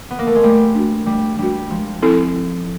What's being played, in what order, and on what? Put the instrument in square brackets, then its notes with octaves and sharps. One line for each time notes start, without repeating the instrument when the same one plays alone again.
[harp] B3
A#3
A3
G#3
[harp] G3 [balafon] A3
[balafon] D4 F#4
[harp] G3 [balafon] A3
[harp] G3 [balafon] D4 F#4
[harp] F3 [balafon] G#3
[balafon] C4 E4 A4